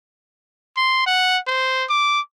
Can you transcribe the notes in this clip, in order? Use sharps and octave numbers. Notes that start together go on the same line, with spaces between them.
C6
F#5
C5
D6